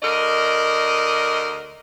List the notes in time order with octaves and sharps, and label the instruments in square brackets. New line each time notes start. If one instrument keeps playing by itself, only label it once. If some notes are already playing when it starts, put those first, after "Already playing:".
[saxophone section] D2 A#4 D5 D#5